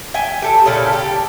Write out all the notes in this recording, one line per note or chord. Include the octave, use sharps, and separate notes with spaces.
E5 G5 G#5
G4 A4 E5
A#2 C#3 E4 A4
G4 A4